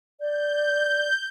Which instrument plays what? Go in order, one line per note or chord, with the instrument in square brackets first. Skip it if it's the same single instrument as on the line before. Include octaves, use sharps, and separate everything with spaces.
[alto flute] D5 [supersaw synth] G6